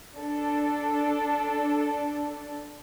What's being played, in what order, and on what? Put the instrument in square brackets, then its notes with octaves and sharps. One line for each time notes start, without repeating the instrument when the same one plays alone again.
[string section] D4 A4